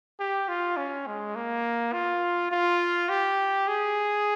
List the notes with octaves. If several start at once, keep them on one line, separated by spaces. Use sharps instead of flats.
G4
F4
C#4
G#3
A#3
F4
F4
G4
G#4